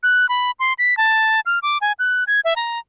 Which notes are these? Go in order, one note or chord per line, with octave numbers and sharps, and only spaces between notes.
F#6
B5
C6
B6
A5
F6
D6
G#5
F#6
G#6
E5
A#5